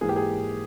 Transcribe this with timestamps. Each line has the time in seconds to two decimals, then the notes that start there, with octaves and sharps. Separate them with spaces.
0.01 G#2 E3 A#3 G#4
0.09 G4
0.16 G#4